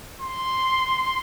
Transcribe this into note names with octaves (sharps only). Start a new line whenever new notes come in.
C6